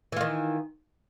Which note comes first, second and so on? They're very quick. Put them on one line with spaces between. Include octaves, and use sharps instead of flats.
E3 F4 D#3